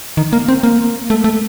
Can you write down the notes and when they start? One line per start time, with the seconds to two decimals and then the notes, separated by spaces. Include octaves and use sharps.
0.17 D#3
0.33 A#3
0.48 C4
0.63 A#3
1.10 A3
1.24 A3